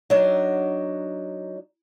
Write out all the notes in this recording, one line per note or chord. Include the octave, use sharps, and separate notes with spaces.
F#3 D4 D#4